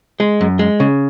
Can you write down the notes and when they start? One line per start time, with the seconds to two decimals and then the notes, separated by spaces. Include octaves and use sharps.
0.20 G#3
0.41 F#2
0.59 G#3
0.80 C#3